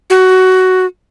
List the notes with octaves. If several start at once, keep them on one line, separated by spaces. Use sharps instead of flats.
F#4